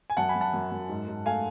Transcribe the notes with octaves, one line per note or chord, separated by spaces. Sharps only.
G#5
F#2 F#5 A5
G#5 B5
F#2
F#5 A5
F#2
F#2
G#2
G#2
A3 F5 G#5